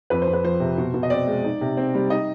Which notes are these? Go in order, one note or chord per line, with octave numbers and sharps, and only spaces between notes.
F2 B4
C5
F2
B4
F3 C5
C3
B2
B2
D#5
C4 D5
G#3
D#4
C3
C4
G3
D#4 D#5